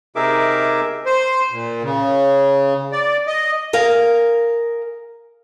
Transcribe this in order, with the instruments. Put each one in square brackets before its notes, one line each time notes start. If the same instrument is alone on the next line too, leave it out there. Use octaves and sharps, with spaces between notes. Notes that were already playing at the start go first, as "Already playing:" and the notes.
[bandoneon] C3 D#4 G#4 A#4 E5 D6
[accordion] C5
A#2
C#3
D5
D#5
[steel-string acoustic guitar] G#4 A#4 F5